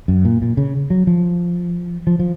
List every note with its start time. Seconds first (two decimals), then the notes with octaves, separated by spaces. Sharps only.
0.08 F#2
0.25 A#2
0.42 A#2
0.57 C#3
0.90 F#3
1.07 F3
2.07 F3
2.20 F3